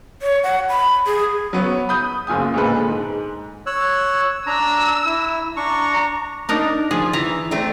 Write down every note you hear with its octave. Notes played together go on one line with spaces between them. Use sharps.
C#5
F#5
B5
G#4
F#3 B3 C#5
B5 D#6 G6 D#7
F#1 F4 G#5 D#6
A#2 D3 G#3 A4 B4
G#2
C#5 E6 F#6
D4 A#5 E6
E4
D4 A#5 C#6
D4 D#4 A#4
F3 G#4
E3 A#5
A3 C4 D4